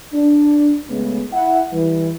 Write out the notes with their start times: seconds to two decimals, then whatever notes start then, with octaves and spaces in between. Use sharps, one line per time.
0.13 D4
0.90 C#3 G#3 A3 B3
1.33 E4 E5 F#5
1.72 E3 G3